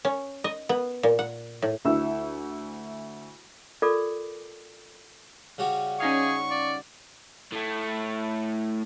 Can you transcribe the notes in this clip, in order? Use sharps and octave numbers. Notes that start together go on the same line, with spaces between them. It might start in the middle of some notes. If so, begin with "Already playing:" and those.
C#4
D#5
B3
A#2
F#5
A2
D2 E4 E5 E6
F4 A4 A#4 D5 D6
C#3 G3 F#4
C#4 D#4 G#4 F5 C#6
D5
A2 A3